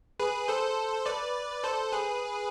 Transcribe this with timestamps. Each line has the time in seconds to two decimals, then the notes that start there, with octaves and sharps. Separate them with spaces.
0.20 G#4 B4
0.48 A4 C5
1.06 B4 D5
1.64 A4 C5
1.92 G#4 B4